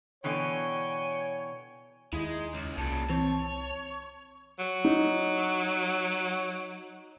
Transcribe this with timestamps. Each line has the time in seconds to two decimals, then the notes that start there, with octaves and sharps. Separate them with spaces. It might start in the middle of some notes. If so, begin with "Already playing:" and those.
0.24 B2 D3 E3 C#5 G5 G#5
2.13 D#2 G#3 D#4 E4
2.54 C#2
2.77 C2 A#2 C#3 A5 C#7
3.10 E3 C4 C#5
4.59 F#3
4.85 D#4